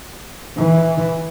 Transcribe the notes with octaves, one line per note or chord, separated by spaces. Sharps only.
E3